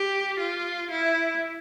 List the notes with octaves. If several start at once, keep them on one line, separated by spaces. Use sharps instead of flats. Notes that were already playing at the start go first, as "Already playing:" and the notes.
Already playing: G4
F4
E4